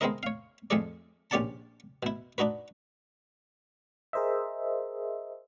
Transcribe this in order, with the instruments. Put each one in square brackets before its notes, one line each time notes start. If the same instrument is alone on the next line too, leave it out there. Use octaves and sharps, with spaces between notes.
[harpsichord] G#3 B3 C4 E4 A#4 D#5
C#5 F5
F2 F3 A3 G#4 A4 D5
A#1 C#4 G4 D5 F#5 A5
B2 E4
D4 D#4 F#4 B4
[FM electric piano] G#4 A#4 C5 D#5 E5